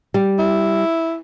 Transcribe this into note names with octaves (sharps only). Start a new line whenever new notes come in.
G3
E4